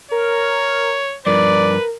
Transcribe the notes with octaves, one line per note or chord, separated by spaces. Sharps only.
A#4 C#5
G2 F3 A#4 B4 D5